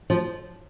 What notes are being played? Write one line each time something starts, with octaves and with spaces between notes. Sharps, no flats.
F3